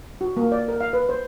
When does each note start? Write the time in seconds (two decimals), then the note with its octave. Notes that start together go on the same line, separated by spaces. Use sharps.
0.21 F#4
0.37 A#3
0.52 D5
0.68 A#4
0.81 F5
0.93 B4
1.09 C5